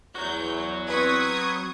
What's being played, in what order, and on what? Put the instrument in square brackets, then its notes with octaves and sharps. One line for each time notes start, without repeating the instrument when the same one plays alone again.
[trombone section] E2 [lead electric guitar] F#3 F#4 [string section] G6
[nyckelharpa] C4 B4 [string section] C#6 D#6 G#6